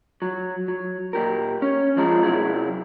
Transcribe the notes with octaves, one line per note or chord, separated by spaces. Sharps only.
F#3
F#3
A#2 G4 A#4
C#4
F2 F3 G#3 A#5
C3 D#3 F#3 E4 G#4